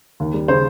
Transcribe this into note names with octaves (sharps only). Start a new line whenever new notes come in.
D#2
G3
C#3 C5